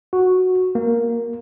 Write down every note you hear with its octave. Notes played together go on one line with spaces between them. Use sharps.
F#4
A#3